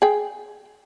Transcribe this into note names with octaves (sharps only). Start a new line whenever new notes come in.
G#4 G5